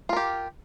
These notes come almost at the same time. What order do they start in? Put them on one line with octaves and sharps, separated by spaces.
F4 A#4 G4